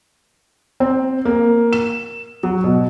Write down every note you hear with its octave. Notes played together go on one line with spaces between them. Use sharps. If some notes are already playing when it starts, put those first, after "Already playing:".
C4
A#3
E7
F#3
B2